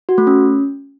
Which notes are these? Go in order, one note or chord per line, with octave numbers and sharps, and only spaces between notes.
F#4
A3
C#4